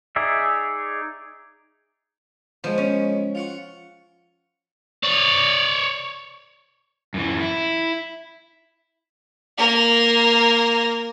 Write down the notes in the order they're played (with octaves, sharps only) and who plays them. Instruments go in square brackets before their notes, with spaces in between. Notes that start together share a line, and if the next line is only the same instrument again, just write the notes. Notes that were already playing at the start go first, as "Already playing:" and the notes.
[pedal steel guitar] D#4 G#4 D5 E5
[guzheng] F3 [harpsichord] G#3 B3
[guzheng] C#4
[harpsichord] F4 F#5 C#6
[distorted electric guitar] C#5 D5
[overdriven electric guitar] F#2 E3
E4
[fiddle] A#3 A#4